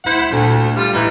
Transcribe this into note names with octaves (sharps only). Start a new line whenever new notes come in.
D2 E4 C5 F#5
D2 A#2 A#3
G3 F4
A2 E3 D4 D#4